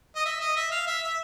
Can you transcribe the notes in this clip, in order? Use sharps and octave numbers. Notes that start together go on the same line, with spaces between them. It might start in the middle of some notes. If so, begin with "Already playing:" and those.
D#5
E5
D#5
E5
F5
E5
E5